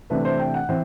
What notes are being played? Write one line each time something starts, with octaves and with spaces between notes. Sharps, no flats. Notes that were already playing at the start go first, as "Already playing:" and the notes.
C3 E3 A3 D4 B4
C5
G5
F#5
E3 C4 C5